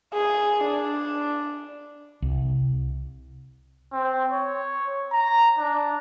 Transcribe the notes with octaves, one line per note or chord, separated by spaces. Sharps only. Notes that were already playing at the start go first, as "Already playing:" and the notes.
G#4
D4
C2
C4
C#5
A#5
D4